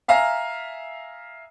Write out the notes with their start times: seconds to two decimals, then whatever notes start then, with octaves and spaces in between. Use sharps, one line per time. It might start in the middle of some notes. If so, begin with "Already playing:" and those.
0.08 E5 F5 G#5 A#5 F6